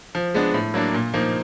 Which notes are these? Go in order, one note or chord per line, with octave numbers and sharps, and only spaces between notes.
F3
G#3 B3 D4
A2
F#3 A#3 D4
A#2
F3 A#3 D#4